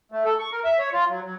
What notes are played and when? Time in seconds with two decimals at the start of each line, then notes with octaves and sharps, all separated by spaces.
0.12 A3
0.25 A4
0.39 C#6
0.52 A#4
0.64 E5
0.79 C#5
0.93 F4
1.09 F#3
1.24 F#3